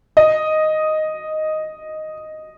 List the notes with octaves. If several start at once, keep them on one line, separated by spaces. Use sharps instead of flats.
D#5